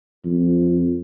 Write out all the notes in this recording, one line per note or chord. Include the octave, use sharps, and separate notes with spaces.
F2